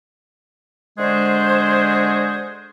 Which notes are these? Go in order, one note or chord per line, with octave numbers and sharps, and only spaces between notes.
D3 G#3 F#4 G#4 C5